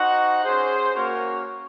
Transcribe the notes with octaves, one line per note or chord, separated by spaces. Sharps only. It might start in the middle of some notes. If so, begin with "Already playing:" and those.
Already playing: D#4 F#4 C5 F#5
C#4 G#4 C5
A#3 C#4 F#4 A#4 C#5